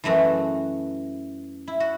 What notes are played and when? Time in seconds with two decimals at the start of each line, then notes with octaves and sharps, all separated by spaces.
0.04 F#2 E3 A3 F#4
1.67 E4
1.80 F#4